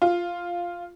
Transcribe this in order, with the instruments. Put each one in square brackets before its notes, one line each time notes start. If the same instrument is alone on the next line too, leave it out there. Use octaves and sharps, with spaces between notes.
[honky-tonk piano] F4